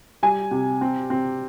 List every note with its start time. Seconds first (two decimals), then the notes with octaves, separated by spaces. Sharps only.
0.23 G3 G#5
0.51 C3
0.81 C4
1.10 C4